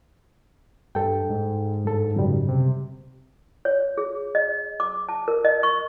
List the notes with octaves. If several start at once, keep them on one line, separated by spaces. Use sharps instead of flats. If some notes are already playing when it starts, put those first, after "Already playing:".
G2 A4 G5
G#2
G2 A4
F#2 C#3 G3
C3
C#5
G#4
D#5
D6
A5
A#4
D#5
C#6